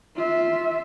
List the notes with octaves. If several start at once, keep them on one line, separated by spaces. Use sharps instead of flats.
F4 E5